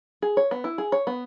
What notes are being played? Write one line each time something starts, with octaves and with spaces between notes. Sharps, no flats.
G#4
C#5
B3
E4
G#4
C#5
B3